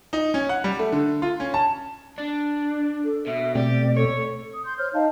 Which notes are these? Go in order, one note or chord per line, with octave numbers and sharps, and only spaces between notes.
D#4
C#4
F#5
G3
A3
D3
F4
C#4
A5
D4
A4
B2 E5
B2 A3 C4 G4 D5
A4 C#5
D#6
C6 G6
C5 C#5 F6 G6
D#4 D#5 F5 A5